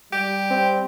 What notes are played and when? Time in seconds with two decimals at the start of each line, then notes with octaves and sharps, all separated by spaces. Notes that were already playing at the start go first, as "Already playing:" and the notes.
0.13 G3 G4
0.50 C4